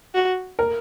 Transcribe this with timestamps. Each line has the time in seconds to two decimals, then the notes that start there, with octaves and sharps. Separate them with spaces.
0.14 F#4
0.59 A#4